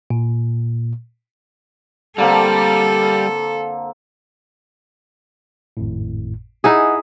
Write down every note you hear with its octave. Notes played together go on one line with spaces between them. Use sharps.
A#2
D3 G3 A#3 C4 A4
G#1 F2 A2
D#4 E4 G#4 D#5 F#5